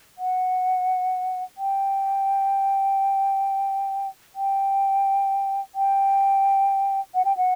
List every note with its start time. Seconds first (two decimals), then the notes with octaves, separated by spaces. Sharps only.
0.18 F#5
1.57 G5
4.35 G5
5.75 G5
7.15 F#5
7.25 G5
7.37 F#5